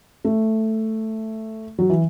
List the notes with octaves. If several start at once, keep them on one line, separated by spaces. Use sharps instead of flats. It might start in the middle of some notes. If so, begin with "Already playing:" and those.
A3
F#3
E3